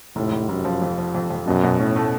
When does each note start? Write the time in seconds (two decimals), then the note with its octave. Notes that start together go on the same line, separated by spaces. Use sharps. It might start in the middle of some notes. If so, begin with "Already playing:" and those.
0.16 F1 A2
0.32 F1
0.49 F1 F#2
0.65 F3
0.82 F2
0.98 F3
1.15 F2
1.31 F2
1.47 F#2 B2
1.64 B2
1.80 A2 C#4
1.96 A3